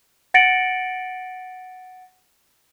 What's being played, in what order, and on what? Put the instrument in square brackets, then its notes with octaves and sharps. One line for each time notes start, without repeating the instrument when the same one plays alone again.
[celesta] F#5 A6 A#6 C#7 D7 F#7